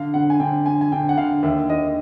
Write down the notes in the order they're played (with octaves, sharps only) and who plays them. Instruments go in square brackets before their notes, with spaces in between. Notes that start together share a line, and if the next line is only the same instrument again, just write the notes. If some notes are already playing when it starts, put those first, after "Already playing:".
Already playing: [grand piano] D3 F5
D3 F#5
G#5
D3 G5
D3 G#5
G#5
D3 G5
F#5
D3 F5
D#2 E5
D#2 D#5